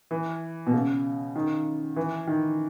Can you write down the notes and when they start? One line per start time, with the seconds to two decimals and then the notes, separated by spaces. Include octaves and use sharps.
0.11 E3
0.67 B2
0.74 C#3
1.36 D#3
1.96 E3
2.27 D#3